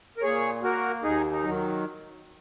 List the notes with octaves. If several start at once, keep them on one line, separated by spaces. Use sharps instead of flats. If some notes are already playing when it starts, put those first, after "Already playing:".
A#4
A#2 G#4 C#5
A#3 F#4 A#4
D#2 D#4 G#4
D#4
D#3 F#3